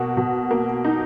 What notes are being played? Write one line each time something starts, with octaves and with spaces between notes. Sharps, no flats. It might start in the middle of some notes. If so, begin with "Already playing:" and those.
Already playing: B2 A#3 F#4
B2
A#3
D#4